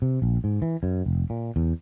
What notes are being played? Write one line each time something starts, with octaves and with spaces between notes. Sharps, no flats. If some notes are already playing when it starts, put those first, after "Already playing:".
C3
A#1
G#2
E3
F#2
F1
A#2
E2